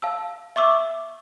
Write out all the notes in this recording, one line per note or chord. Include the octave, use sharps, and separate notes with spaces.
F5 A5 E6
E5 C#6 D6 E6